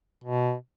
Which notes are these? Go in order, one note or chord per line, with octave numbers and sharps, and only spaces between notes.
B2